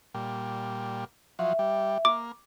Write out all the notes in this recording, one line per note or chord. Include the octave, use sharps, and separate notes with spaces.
A#2 G3
F3 F#3 E5
G3
A#3 D6